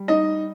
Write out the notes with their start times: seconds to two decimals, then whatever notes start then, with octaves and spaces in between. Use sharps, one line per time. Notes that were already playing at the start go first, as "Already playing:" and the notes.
Already playing: G3
0.08 D#4 D#5